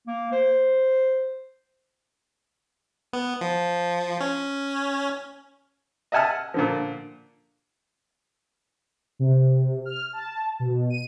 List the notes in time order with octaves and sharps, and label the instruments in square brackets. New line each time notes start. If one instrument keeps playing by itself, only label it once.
[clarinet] A#3
C5
[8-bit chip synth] B3
F3
C#4
[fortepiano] D#5 E5 F#5 G#5 A5 F6
A#2 D3 F3
[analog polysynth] C3
F6
A5
B2
D#7